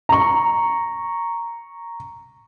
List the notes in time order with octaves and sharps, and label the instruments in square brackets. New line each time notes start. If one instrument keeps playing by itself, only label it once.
[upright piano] A#5 C#6